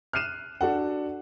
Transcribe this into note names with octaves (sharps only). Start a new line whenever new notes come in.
F6 F#6 C7 D#7 E7
D4 F#4 A4 F#5